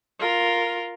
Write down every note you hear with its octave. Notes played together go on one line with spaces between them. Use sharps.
F4 A#4